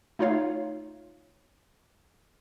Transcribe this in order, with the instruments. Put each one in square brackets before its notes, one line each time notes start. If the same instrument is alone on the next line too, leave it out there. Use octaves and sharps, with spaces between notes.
[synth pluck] A3 D#4 F4 C#5 F5